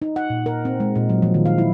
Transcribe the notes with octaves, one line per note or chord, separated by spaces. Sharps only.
D#4
F#5
A#2
A#4
C4
G#3
A#2
F#3
F3
D#3
F5
E4